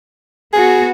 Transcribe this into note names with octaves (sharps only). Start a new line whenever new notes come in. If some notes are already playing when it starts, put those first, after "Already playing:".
B3 F#4 G#4